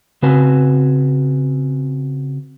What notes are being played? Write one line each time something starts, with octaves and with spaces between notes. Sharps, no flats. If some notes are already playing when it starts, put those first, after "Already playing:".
C#3 C4 F#4 B4 G#5 A5